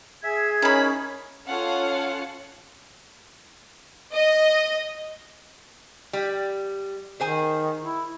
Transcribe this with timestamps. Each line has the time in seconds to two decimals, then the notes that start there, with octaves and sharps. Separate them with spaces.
0.23 G#4 E5 G#5 G#6
0.62 C#4 D#4 E4 A#4 B5
1.47 C#4 F4 A4 F5 F#5
4.13 D#5
6.13 G3
7.20 D#3 G#4 C5 G#5
7.82 E4